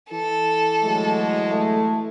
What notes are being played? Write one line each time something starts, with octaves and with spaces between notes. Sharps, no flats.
E3 A4
F#3 G#3 A3
A3